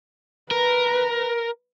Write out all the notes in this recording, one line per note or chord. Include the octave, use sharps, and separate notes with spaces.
A#4 B4